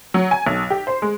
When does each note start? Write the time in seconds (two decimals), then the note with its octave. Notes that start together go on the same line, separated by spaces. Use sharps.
0.14 F#3
0.31 G#5
0.47 B1
0.70 G4
0.87 C5
1.02 G#3